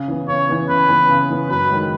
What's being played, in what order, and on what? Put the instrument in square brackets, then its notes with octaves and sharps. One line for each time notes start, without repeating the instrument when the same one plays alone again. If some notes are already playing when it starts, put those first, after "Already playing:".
Already playing: [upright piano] C#3
E3 B3
[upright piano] C#3 [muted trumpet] C#5
[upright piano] E3 B3
[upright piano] C#3 [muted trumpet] B4
[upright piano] E3 B3
C#3
E3 B3
[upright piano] F#2 [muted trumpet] B4
[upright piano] D#3 G#3